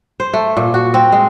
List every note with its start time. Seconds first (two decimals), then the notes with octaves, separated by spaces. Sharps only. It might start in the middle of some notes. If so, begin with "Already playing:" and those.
0.20 C5
0.33 A3
0.57 A#2
0.74 F#4
0.94 C4
1.12 G#3